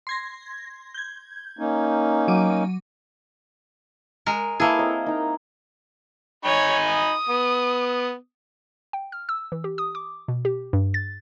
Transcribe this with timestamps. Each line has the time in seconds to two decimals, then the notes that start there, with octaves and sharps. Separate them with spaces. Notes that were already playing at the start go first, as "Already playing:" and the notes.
0.07 C6 G#6 A#6
0.94 G6 G#6
1.59 A#3 C#4 D#4
2.28 F#3 D6 D#7
4.26 G#3 A#4
4.60 A#3 E4 G#4 A4 B4
4.78 C4 A#4 D#5
5.06 D#4 A#5
6.45 D#4 C#5 G#5 B5
6.88 D#6
7.29 B3
8.93 G5
9.12 F6
9.29 E6
9.52 E3
9.64 G4
9.78 D#6
9.95 D6
10.28 B2
10.45 G4
10.73 G2
10.94 A6